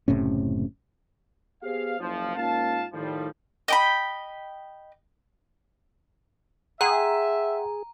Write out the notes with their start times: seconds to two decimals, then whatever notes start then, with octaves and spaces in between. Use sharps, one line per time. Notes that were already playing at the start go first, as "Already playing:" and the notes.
0.08 F#1 A2 C3 C#4
1.63 B3 G4 G#4 C5 F5
1.99 F#1 F3
2.36 G#2 A#3 C#4 F4 F5 A5
2.93 A2 D#3 F3 G3
3.68 D#5 G5 B5
6.81 G#4 E5 F#5 G5 A#5 C6